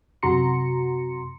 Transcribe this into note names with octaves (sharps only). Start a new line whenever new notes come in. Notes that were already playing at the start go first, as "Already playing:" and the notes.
F#2 C3 F#4 A#5 C6 C#7